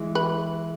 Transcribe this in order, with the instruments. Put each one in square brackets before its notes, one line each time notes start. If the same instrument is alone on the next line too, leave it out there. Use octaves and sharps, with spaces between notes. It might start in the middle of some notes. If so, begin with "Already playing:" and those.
Already playing: [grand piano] E3 G#3
[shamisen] B4